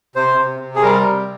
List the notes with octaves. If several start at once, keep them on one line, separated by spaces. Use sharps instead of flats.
C3 C5
C3
C3
G#4
G3 A#4
C3